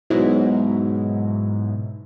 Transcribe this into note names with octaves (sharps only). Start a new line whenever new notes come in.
G#2 B2 F#3 E4